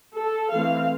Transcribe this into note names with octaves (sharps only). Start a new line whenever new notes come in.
A4
E3 A3 C4 F5